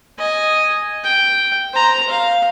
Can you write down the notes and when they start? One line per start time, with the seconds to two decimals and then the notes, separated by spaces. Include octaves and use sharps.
0.18 D#5 G#5
1.04 G5
1.73 C5 A#5
2.09 F5